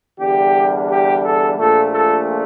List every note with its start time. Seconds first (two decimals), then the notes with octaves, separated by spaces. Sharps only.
0.20 E2 D3 G3 G4
0.89 G4
1.24 A4
1.58 A#1 A#2 A3 A4
1.92 A4